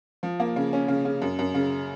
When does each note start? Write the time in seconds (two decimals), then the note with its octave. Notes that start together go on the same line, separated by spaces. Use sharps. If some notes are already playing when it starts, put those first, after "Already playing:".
0.23 F3
0.40 A#3
0.56 C#3
0.73 C#4
0.88 C#3
1.05 C#3
1.22 F#2
1.39 F#2
1.54 C#3